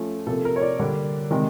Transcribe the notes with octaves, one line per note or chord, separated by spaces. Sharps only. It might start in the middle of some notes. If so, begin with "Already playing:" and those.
Already playing: F3 A3 C#4
C3 F3 A#3 A4
A#4
C#5
D5
D3 G3 A#3 D4
C3 D#3 G#3